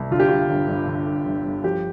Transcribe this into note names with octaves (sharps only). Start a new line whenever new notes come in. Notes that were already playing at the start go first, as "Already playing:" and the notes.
Already playing: C2
D3 F4
G4
G2 F4
G1
G1
D3
G2
G1
G1
F3 G4